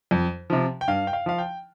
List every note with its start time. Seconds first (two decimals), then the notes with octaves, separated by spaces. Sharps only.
0.11 F2
0.50 C3 F3
0.81 G5
0.88 G2 F5
1.07 G5
1.13 F5
1.26 F3 F5
1.38 G5